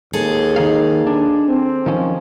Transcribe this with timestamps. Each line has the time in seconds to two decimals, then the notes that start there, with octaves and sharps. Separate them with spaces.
0.13 D#2 G#4 A4
0.56 D#3 D#4 F5
1.07 D4
1.48 C4
1.86 D#3 F3 C#4